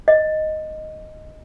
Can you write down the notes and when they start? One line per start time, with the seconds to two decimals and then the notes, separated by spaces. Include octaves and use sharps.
0.08 D#5